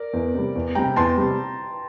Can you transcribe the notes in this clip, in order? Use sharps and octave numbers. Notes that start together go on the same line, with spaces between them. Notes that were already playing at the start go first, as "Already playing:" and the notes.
Already playing: A#4 D5
E2
C3 G3
E2
C3 G3 G5 A#5
E2 A5 C6
C3 G3